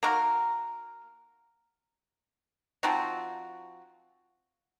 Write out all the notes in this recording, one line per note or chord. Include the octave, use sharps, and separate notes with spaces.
A#3 D#4 F#4 A#4
F3 C4 D#4 F#4